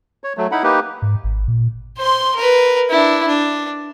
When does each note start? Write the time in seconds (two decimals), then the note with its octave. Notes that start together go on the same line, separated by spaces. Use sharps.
0.24 C#5
0.37 F#3 A3
0.52 D#4 E4 F#5 B5
0.64 A#3 D#4 G4 B4
1.02 G#2
1.24 G#1
1.48 A#2
1.98 C5 C6
2.35 A#4 B4
2.90 D4 E4
3.28 D4